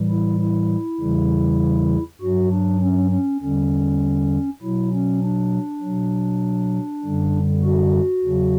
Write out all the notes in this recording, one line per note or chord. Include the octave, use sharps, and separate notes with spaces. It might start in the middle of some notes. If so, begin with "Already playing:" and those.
Already playing: A2 E3 G3
E4
E4
E2 C#3 E3 G3
G2 F#3 F#4
D4
C#4
C#4
E2 D3 G3 C#4
B2 F#3 E4
C#4
D4
F#3
B2
F#2 D3 G3
F#4
E2 C#3 F#3